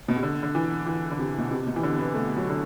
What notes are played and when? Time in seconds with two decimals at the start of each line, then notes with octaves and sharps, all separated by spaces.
0.08 B2
0.16 C3
0.23 D3
0.43 D3
0.55 E3
0.86 E3
1.11 D3
1.19 C3
1.38 B2
1.51 C3
1.67 B2
1.76 E3
1.83 D3
1.99 B3
2.14 A3
2.37 F#3
2.50 D3